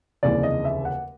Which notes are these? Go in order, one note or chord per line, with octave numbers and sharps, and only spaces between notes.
F1 D#2 C#3 E3 D5
D#5
E5
F#5